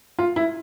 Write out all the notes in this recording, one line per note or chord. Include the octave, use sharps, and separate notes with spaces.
F4
E4